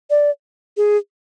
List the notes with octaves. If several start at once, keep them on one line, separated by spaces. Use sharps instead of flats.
D5
G#4